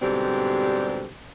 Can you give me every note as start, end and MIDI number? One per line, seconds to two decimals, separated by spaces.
0.01 1.06 44
0.01 1.06 47
0.01 1.06 50
0.01 1.06 55
0.01 1.06 60
0.01 1.06 67